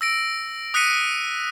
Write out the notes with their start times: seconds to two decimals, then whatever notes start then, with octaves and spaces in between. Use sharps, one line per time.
0.01 E6 A#6 D7
0.74 D#6 F#6 A#6 B6 C#7 D#7